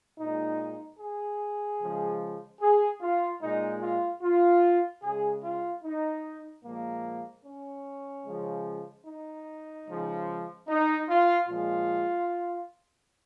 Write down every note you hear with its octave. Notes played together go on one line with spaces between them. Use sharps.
A#2 G#3 D#4
G#4
C#3 F3 G#3
G#4
F4
A#2 G#3 D#4
F4
F4
C#3 G#3 G#4
F4
D#4
A#2 F3 G#3 A#3
C#4
C#3 F3 G#3
D#4
C#3 F3 G#3
D#4
F4
A#2 F3 G#3 F4